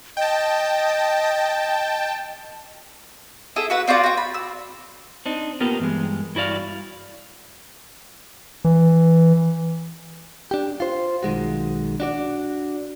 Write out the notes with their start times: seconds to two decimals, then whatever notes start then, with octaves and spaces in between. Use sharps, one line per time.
0.17 D#5 G5 A5
3.56 E4 G#4 A4 E5
3.70 F#4 B4 E5 F#5
3.87 C4 F4 F#4 D5
4.04 F#4 G5
4.17 B5
4.34 E6
5.26 C4 D4 D#4
5.60 A#3 B3 F4 G4
5.79 G2 E3 G#3
6.35 G2 E4 F#4 D5 F5
8.65 E3
10.51 D4 G4
10.80 F4 C5
11.23 B1 D#3 G#3 F#4
12.00 D4 F#4 D5